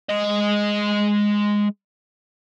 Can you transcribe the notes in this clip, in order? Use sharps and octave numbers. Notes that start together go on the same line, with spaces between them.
G#3 D#5